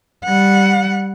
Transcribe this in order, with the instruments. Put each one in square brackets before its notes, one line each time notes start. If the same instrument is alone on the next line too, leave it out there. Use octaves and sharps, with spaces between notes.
[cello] G3 F#5